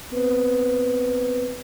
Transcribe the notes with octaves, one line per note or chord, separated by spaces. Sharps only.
B3 C4 B4 C5